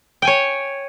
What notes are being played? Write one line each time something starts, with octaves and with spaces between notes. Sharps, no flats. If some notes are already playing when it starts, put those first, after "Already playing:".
C#5 G5 G#5